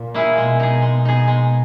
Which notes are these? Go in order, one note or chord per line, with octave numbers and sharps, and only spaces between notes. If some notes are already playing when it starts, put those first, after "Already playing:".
Already playing: A#2
A#3 E4 G#4
B2 G#3
D#4 G#4
G#3
D#4 G#4
G#3